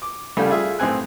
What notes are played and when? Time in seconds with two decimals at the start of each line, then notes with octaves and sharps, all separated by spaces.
0.02 D6
0.37 C2 C#3 G3 A3
0.50 F4 G#4 E5
0.79 B1 A2 C4 G#5 F#6